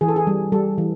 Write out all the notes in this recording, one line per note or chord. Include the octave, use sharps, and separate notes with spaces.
E3 G#4
A4
G#4
G3
G3 A4
E3